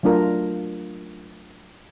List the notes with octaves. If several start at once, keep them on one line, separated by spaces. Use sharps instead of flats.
F#3 A3 D4 F4 A#4